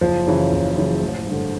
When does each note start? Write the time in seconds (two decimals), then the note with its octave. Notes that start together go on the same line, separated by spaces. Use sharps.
0.01 F#1 F3
0.26 F#2 C#3 E3
0.52 F#1
0.76 F#2 C#3 E3
1.02 A1
1.27 G2 D3